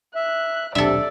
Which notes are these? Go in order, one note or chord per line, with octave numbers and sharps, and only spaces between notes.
E5 F#6
D#1 B1 C3 D4 A4 D5 E5